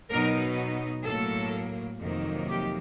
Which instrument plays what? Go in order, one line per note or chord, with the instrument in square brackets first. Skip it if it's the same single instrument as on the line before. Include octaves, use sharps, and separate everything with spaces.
[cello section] B2 F#3 B3 D#4 A#4
A2 F#3 A#3 A4
F2 C3 D#3 F#3 A#3
G4